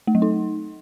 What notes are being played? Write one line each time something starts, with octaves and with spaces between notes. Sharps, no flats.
A3
F#3
D#4